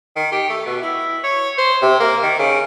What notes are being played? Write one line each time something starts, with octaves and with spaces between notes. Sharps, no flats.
D#3
G4
A3
B2
E4
C#5
C5
C3
A#3
D#3
C#3